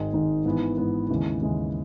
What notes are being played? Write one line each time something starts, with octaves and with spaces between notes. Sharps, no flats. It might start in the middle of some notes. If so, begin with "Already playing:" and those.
Already playing: G#1 G#2 D#3 G#3 D#4
G#1 G#2 D#3 G#3 D#4
G#2 E3 B3
G#2 E3 B3
D#2 C#3 E3 G#3
D#2 C#3 E3 G#3